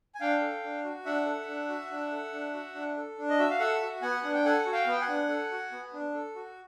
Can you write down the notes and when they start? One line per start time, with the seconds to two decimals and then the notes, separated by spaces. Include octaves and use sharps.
0.15 G#5
0.20 D4 F5 G5
0.41 A4
0.64 D4
0.84 F#4
1.05 D4 E5 F#5
1.26 A4
1.48 D4
1.69 F#4
1.91 D4
2.12 A4
2.32 D4
2.54 F#4
2.75 D4
2.97 A4
3.18 D4
3.29 D#5
3.39 F#4 E5
3.50 F5
3.59 A4 E5 F#5
3.82 F#4
4.02 B3 F#5 G#5
4.24 D4
4.34 G5
4.45 A4 F#5 G#5
4.66 F#4
4.73 F5 G5
4.86 B3 G5
5.01 F#5 G#5
5.09 D4
5.29 A4
5.51 F#4
5.72 B3
5.93 D4
6.14 A4
6.35 F#4